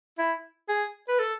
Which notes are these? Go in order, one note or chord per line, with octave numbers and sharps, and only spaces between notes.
E4
G#4
B4
A4